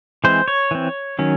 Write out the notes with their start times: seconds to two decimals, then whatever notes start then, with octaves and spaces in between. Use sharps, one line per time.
0.24 E3 G#3 C4 C5
0.48 C#5
0.71 E3 C4
1.19 D#3 F#3 C#4